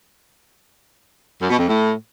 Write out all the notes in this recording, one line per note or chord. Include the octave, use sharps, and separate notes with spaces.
F#2
B2
F2
A2